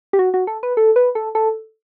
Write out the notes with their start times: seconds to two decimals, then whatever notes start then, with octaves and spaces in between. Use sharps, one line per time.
0.13 G4
0.19 F#4
0.34 F#4
0.47 A4
0.63 B4
0.77 A4
0.96 B4
1.15 A4
1.35 A4